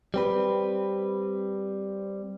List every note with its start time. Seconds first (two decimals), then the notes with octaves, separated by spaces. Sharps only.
0.14 G3 C4 B4